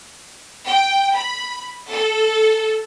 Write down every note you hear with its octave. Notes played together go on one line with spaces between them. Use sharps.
G5
B5
A4